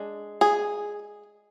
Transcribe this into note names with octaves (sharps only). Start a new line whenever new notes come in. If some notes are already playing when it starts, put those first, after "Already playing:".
Already playing: G#3 D4
G#4